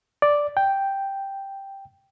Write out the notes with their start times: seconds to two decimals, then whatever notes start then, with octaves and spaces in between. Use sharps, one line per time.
0.22 D5
0.57 G5